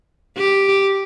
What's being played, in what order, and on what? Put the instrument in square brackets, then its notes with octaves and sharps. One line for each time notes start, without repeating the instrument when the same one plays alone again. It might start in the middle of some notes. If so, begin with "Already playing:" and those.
[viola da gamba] G4